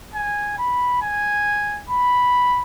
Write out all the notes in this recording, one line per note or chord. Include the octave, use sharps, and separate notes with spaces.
G#5
B5
G#5
B5